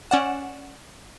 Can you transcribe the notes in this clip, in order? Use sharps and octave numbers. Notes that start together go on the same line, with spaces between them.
C#4 D5 F#5 E7